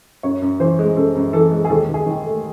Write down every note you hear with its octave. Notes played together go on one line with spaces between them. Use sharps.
F#2 C#5
F#2
E3 C5
G#3
F#2 A4
F#2
E3 A4
G#3
G#4
D#2 A4
D#2
G#4
D#3
A3